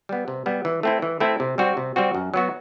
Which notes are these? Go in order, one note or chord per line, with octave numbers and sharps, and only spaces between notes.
G3 B3
C3
G3 B3
E3
A3 C4 E4
E3
A3 C4 E4
C3
G3 C4 F#4
C3
G3 C4 F#4
F#2
F#3 B3 F#4